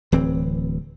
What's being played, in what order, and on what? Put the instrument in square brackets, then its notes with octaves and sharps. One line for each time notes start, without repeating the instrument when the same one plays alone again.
[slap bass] D1 E3 C4